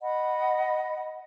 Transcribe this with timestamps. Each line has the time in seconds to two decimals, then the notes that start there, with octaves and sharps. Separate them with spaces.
0.02 D#5 F#5 B5